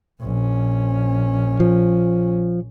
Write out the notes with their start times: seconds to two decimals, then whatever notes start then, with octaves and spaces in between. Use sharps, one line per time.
0.21 A#1 C#4
1.60 F3